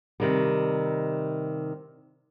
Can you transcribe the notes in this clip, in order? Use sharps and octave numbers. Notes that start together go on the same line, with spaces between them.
C3 D#3 G3